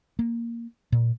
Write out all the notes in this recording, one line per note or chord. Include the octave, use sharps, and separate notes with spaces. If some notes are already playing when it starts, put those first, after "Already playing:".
A#3
A#2